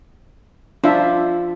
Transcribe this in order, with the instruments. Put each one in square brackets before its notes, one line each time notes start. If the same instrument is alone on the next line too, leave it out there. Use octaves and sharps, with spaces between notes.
[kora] F3 [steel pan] D4 E5